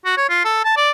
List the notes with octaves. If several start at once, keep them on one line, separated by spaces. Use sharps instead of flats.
F#4
C#5
F4
A4
A5
D5